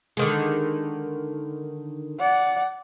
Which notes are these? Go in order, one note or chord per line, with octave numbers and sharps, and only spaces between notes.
D3 D#3 G#3
D5 F#5